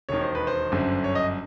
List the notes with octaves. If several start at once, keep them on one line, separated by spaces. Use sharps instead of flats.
E1 D#2 D#3 C#5
C5
B4
C5
G1 F#2 D3
C#5
D#5